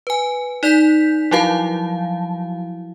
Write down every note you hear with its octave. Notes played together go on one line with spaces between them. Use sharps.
B4 G#5
D#4 D5 G6 B6
F3 F#3 E4 F#4 F5 A5